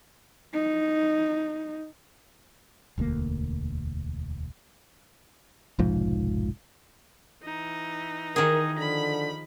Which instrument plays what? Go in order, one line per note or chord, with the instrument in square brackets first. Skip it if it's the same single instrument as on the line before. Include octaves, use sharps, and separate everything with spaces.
[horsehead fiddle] D#4
[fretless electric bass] E1 D2 G#3 A#3
[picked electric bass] F1 B1 G#2 F3
[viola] E3 D#4
[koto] D#3 G#4 [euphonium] A#4
[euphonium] D3 [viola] F3 B5